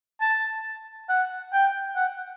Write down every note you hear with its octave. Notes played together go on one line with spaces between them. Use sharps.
A5
F#5
G5
F#5